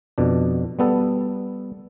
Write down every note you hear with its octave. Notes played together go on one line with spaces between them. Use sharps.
F2 B2 D4
G3 B3 A4